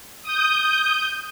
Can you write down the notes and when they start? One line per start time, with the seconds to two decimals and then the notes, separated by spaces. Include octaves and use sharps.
0.23 D#6 G6